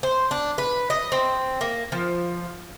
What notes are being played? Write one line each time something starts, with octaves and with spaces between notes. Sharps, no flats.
C5
D4
B4
D#5
C4
A#3
F3